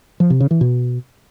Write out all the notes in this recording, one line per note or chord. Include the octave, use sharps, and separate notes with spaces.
F3
C3
C#3
E3
B2